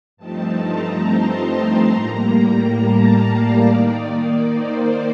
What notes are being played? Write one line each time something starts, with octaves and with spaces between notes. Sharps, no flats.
G2 F3 A3 C4 D#4 A5
A#5
C6
C6
A2 G3 A#3 A#5
A5
F5
D5
D#3 A#3 D#4
C5